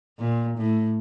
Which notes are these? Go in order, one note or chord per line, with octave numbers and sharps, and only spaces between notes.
A#2
A2